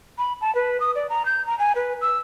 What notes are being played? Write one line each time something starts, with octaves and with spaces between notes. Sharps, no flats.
B5
A5
B4
D#6
D5
A#5
G6
A#5
G#5
B4
E6